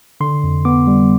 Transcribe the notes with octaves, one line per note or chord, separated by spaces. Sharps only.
D3 C6
F2
B3 D6
G3